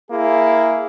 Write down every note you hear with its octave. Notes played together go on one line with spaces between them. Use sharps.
A#3 E4 G#4